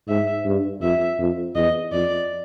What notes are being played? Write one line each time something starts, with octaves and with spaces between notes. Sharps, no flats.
G#2 E5
G2
F2 E5
F2
E2 D#5
F2 D5